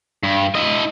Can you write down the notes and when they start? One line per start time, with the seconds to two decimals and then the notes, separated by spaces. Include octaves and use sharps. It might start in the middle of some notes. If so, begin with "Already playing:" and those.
0.23 G2
0.55 E4 D#5